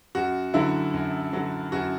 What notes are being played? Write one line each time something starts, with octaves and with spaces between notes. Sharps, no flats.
F#2 F#4
D3 F#3 E4
F#2
D3 F#3
F#2 F#4